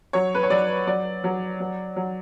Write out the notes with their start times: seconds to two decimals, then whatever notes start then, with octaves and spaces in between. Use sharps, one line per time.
0.13 F#3 C#5
0.35 B4
0.43 C#5
0.50 F#3 D5
0.87 F#3 D5
1.24 F#3
1.60 F#3
1.96 F#3